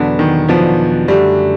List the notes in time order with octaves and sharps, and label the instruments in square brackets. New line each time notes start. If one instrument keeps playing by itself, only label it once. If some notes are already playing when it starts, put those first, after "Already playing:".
Already playing: [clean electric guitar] E2 B2 F#3 B3 D4 [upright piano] D3
[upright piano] D#3
[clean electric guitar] E2 B2 F#3 B3 D4 [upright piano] F3
[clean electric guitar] F#2 D3 F#3 A3 [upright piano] G3